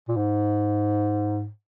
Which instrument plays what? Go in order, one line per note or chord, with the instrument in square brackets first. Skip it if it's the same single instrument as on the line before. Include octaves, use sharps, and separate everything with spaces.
[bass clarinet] A#2
G#2